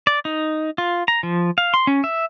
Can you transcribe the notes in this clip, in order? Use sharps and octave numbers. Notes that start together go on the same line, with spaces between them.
D5
D#4
F4
A#5
F3
F5
C6
C#4
E5